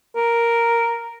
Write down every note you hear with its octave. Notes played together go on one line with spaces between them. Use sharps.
A#4